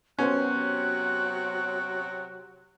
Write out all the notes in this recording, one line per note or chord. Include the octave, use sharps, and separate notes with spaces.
C3 F#3 B3 C#4 F#4 A#4 C5 F#6